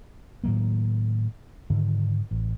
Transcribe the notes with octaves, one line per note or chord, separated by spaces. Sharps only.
A2 D#3 F#3 A#3
G#2 D3 D#3
A1